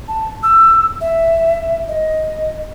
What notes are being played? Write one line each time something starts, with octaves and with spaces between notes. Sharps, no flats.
A5
E6
E5
D#5